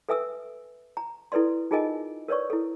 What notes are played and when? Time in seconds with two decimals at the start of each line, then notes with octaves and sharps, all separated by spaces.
0.09 A4 B4 E5 G#5 D#6 E6
0.97 A#5
1.32 E4 A4 B4 D5 C6
1.71 D#4 F4 G#4 A#4 D#5 G#5
2.28 A#4 B4 C#5 D5 C#6
2.50 E4 A4